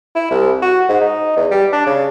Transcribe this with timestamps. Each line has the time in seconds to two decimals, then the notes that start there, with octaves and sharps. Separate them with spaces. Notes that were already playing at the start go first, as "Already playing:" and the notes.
0.16 E4
0.31 C2
0.62 F#4
0.89 G#2
1.01 D#4
1.36 E2
1.51 G3
1.73 D4
1.87 C#3